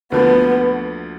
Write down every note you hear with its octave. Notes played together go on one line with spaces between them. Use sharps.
D2 D3 F3 A#3 B3